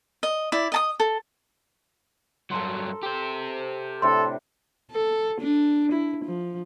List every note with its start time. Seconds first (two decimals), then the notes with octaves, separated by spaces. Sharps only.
0.23 D#5
0.52 E4 D5
0.72 D#5 A5 D#6
1.00 A4
2.51 G2 F#3 A4 A#4 C6
3.03 G4 C5
4.02 A2 C3 D4 A4 C6
4.91 A4
5.41 D4
5.92 E4
6.25 F3